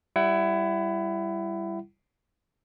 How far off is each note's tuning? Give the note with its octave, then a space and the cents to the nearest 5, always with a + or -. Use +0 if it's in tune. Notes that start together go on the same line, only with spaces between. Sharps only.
G3 +0 E4 +20 F#5 +35